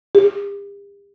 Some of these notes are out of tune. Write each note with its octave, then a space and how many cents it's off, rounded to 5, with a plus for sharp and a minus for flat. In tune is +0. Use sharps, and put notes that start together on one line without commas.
G4 +40